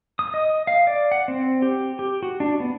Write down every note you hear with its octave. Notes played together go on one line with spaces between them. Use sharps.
D#6
D#5
F5
D5
F#5
C4
G4
G4
F#4
D4
B3